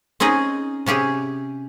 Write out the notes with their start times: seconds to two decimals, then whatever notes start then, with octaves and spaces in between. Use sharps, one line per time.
0.20 C4 C#4 D#4 G#4 D#5
0.86 C3 C#4 G4 G#4